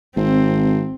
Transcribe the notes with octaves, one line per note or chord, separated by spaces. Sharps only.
G#1 C4